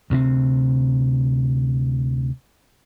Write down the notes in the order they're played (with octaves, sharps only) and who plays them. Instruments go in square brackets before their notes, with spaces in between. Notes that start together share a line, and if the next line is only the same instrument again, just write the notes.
[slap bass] D2 C3 G#3 C4